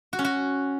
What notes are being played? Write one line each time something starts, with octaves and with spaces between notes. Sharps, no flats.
F#4
C#4
F#4